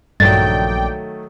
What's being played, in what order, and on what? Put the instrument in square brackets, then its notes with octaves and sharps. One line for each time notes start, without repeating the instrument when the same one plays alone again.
[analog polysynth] A#1 D5 G5 [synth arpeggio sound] G2 [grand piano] D#3 F#3 A3 [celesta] A6